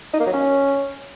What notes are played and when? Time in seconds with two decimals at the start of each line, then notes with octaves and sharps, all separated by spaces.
0.13 D#4
0.20 A#3
0.26 F#3
0.33 C#4